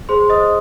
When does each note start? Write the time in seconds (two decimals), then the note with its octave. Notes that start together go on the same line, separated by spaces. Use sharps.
0.09 G#4 C5 C6
0.30 C5 D#5 D#6